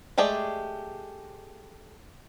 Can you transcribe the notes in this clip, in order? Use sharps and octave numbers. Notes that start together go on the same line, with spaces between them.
G#3 A3 G4 G#4 D5